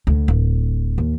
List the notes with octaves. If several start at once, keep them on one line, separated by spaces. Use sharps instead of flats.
D2
D1
D#2